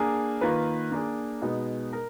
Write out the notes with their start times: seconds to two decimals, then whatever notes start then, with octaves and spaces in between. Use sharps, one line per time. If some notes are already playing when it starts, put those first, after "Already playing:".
Already playing: A#3 D4 G#4
0.41 D#3 A#3 F4 B4
0.92 A#3 D4 G#4
1.42 B2 G#3 B3 D#4
1.93 A#4